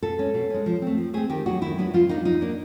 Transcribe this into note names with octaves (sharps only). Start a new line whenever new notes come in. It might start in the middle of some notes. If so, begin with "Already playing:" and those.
B2 A4
G#3 C#4
B2
G#3 C#4
F3
A3 C4
F3
A3 C4 G#4
D#3 G4
F#3 B3 D4 F#4
D#3 E4
F#3 B3 D4
F3 F4
A#3 D4 D#4
F3 D#4
A#3 D4